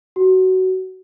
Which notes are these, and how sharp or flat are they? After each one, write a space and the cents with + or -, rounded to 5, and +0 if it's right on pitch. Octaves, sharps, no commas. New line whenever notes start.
F#4 +20